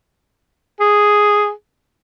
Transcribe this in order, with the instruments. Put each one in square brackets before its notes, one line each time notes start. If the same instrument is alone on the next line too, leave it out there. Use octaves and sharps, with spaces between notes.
[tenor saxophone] G#4